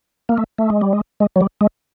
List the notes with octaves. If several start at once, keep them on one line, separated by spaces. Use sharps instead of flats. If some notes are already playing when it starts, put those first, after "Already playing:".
A#3
A3
A3
G#3
G3
G#3
G#3
F#3
G3
G#3